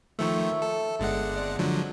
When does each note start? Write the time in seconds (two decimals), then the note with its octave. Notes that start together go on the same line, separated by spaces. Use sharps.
0.19 D#3 F3 A3 C#5 E5
0.41 E6
0.62 A4
0.99 G1 G#3 A4 D5 F#5
1.36 C4 D5
1.59 D3 F3 F#3 G#3